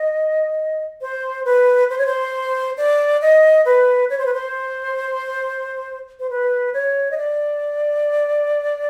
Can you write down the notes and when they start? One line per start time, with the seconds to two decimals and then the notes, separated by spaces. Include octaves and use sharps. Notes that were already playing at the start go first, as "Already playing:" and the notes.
Already playing: D#5
1.01 C5
1.45 B4
1.90 C5
1.98 C#5
2.06 C5
2.78 D5
3.22 D#5
3.65 B4
4.10 C#5
4.18 C5
4.26 B4
4.34 C5
6.20 C5
6.30 B4
6.74 C#5
7.11 D#5
7.17 D5